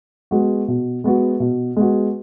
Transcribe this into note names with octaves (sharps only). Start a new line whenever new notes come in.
G#3 B3 F#4
B2
G#3 B3 F#4
B2
G#3 B3 F#4